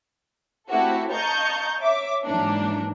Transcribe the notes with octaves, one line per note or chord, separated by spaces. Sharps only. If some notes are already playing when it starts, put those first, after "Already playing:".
A3 C4 E4 F#4 G4 A4
D#5 F5 A5 A#5 C#6 G6
C#5 E5 D6
G#2 E3 F#3 A#3 D4 D#4